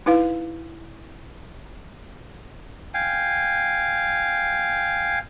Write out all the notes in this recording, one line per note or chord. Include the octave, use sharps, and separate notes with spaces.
D#4 E4 B4 F5
F5 G5 G#5